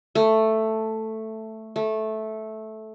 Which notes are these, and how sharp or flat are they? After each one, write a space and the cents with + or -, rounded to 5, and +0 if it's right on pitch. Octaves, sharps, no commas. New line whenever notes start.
A3 +5
A3 -10